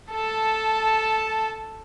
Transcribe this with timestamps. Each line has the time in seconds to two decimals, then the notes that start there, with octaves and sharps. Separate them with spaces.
0.12 A4 A5